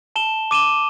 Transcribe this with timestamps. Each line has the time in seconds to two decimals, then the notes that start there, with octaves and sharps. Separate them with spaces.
0.16 A5 E7 G7
0.51 D6 D#7 E7 G7